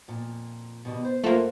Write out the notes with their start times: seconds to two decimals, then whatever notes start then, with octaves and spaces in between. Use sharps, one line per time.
0.08 F2 A#2
0.85 B2 D#3 G3
1.05 C5
1.24 G2 A3 A#3 F4 F#4 C5